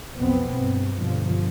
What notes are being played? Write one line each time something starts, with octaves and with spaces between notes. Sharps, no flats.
B1 F2 B3 C4
G2
G2 B2 D3 F3